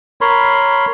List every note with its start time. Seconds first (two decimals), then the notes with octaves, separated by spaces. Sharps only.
0.21 A#4 C#5 B5 C6